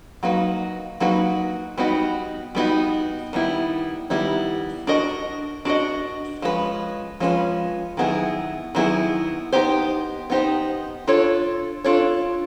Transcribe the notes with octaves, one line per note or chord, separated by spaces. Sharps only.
F#3 A#3 D#4 F#4 B4
F#3 A#3 D#4 F#4 B4
G3 B3 D#4 F#4
G3 B3 D#4 F#4
D#3 G3 B3 E4
D#3 G3 B3 E4
D4 F#4 A#4 D#5
D4 F#4 A#4 D#5
F3 G#3 C#4 F#4 B4
F3 G#3 C#4 F#4 B4
D#3 F#3 B3 E4 G#4
D#3 F#3 B3 E4 G#4
B3 D#4 G4 C5
B3 D#4 G4 C5
D4 F4 A4 C#5
D4 F4 A4 C#5